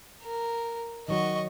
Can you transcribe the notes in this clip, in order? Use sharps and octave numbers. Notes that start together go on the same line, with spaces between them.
A#4
D#3 F#3 F#4 D#5 C#6